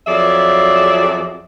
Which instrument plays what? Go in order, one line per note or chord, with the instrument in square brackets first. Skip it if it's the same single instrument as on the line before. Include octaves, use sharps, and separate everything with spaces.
[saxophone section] F2 F#3 G#4 D5 E5